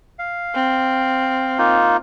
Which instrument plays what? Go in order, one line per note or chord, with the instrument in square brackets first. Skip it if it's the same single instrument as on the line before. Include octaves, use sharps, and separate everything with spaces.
[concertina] F5
[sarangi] C4
[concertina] A#3 D#4 F4